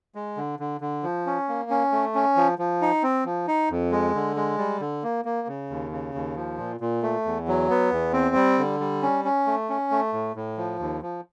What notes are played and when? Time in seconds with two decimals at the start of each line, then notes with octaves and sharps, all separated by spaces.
0.15 G#3
0.37 D3
0.59 D3
0.81 D3
1.03 F3
1.26 C#4
1.48 A#3
1.70 C#4
1.92 A3
2.15 C#4
2.37 F3
2.58 F3
2.82 D#4
3.03 C4
3.25 F3
3.48 D#4
3.70 F2
3.91 G#3
4.15 D3
4.36 G#3
4.58 G3
4.81 D3
5.03 A#3
5.25 A#3
5.47 C#3
5.70 D#2
5.91 C#3
6.15 D#2
6.36 F3
6.58 A#2
6.80 A#2
7.03 A3
7.25 E2
7.48 F#3
7.70 B3
7.92 E2
8.13 C4
8.35 G3
8.58 D3
8.80 G3
9.03 C#4
9.25 C#4
9.47 A3
9.70 C#4
9.91 A3
10.13 A2
10.36 A2
10.57 F3
10.79 D#2
11.02 F3